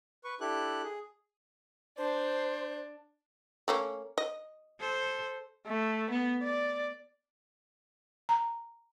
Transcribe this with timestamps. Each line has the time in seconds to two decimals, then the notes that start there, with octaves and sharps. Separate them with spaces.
0.24 B4 C#6
0.41 D4 E4 G4 A4 F#6
0.83 G#4
1.98 D4 C5
3.68 A3 A#3 C#4
4.18 D#5
4.80 A4 C5
5.67 A3
6.10 B3
6.43 D5
8.29 A#5